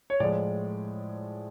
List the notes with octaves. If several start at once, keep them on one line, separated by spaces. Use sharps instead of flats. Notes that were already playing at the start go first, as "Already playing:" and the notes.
C#5
A2 F3 G#3 D5